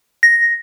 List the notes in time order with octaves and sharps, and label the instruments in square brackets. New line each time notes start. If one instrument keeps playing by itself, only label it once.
[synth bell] A#6